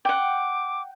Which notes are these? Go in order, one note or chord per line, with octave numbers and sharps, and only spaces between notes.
F#5 G5 D6